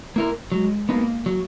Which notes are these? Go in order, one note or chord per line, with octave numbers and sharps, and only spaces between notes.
A#3 E4 A#4
F#3 G#3
A#3 B3 D#4
F#3